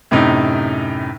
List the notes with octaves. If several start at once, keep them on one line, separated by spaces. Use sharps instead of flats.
F#2 A2 C3 D#4